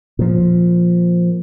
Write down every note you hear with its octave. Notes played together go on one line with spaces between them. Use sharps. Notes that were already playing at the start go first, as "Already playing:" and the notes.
A#2 F3